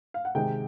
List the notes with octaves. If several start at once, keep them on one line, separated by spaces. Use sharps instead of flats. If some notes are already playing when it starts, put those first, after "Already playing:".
F5
F#5
C3 D#3 G#3 C4 G5